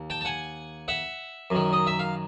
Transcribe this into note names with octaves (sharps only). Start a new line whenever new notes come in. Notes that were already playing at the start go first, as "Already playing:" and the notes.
Already playing: D#2
G5 A5
A5
F#5 G#5
E5 F#5
F#2 D#3
D#5
E5
F5